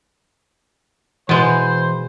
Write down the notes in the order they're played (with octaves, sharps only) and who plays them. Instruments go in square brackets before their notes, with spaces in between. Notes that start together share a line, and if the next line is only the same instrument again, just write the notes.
[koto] B2 G#3 [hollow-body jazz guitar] E3 B4 [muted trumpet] C5